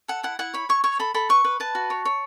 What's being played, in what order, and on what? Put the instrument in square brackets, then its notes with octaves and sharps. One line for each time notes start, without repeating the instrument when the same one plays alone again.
[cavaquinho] A4 F#5
E4 F#5
E4 F#5
C#5 B5
C#5 C#6
C#5 C#6
A4 B5
A4 B5
B4 C#6
B4
B4 A5
F#4
C#5
C#5